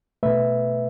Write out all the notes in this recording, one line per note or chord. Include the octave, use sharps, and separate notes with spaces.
B2 A3 B4 E5